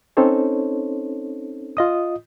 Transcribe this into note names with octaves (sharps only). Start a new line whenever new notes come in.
C4 C#4 D#4 A4 C5 C#5
F4 D#5 D#6